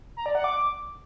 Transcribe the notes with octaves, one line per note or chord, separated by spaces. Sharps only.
A#5
D5
F#5
D6